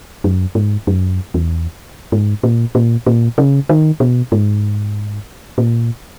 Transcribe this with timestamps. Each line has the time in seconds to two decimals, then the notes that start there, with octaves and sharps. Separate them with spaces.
0.24 F#2
0.55 G#2
0.87 F#2
1.34 E2
2.12 G#2
2.43 A#2
2.75 A#2
3.06 A#2
3.38 C#3
3.69 D#3
4.00 B2
4.32 G#2
5.58 A#2